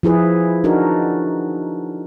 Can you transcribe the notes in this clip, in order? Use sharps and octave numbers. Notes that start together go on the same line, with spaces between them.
F3 E4 G#4 B4
D4 D#4 F#4 A#4